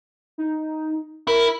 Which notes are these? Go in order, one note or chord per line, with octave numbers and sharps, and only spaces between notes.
D#4
E4 A#4